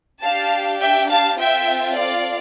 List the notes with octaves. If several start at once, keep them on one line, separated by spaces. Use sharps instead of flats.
D4 G4 F5 A5
E5 G5
F5 A5
C4 F4 A4 E5 G5
D5 F5